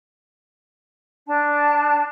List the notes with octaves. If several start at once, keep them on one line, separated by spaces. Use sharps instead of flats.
D4 A5